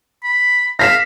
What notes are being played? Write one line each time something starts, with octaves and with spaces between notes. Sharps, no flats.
B5
F5 A#6 B6 E7